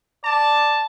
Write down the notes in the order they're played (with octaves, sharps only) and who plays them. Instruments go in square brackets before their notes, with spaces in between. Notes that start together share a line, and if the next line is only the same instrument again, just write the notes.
[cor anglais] D5 [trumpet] A5